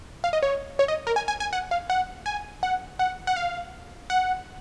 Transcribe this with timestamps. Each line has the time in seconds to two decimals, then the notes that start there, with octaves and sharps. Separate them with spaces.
0.24 F5
0.33 D#5
0.43 C#5
0.79 C#5
0.88 D#5
1.07 A#4
1.16 G#5
1.28 G#5
1.40 G#5
1.53 F#5
1.71 F5
1.90 F#5
2.26 G#5
2.63 F#5
2.99 F#5
3.27 F#5
3.36 F5
4.10 F#5